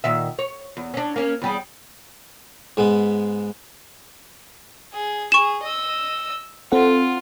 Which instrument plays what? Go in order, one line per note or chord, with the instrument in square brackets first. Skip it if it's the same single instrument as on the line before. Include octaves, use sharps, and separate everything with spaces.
[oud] A#2 D#3 E5
C#5
E2
C#4 D4
A#3 C#4
E2 G3 G#4
[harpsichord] G#2 G#3 B3
[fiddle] G#4
[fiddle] G#4 [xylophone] C#6 E7
[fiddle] D#5 E6
[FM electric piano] C4 A4 F#5 [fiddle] F4